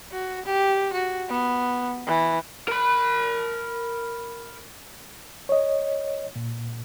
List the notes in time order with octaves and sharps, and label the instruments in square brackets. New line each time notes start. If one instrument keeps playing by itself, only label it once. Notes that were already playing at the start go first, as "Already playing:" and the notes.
[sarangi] F#4
G4
F#4
B3
E3
[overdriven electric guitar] A#4 B5
[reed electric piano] C#5 D#5
A#2